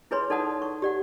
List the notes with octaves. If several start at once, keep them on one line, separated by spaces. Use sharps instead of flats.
E4 G#4 B4 C#5 B5 C6
D#4 A4 D5 F#5 A5 D#6
C#6
G4 D5 F#5